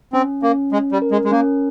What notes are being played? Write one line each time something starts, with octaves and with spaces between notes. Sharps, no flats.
C4 C#4
A#3 C#4
G#3 C#4
G3
A#4
G#3
G#3
A#3 C#4